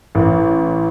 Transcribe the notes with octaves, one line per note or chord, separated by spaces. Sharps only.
A1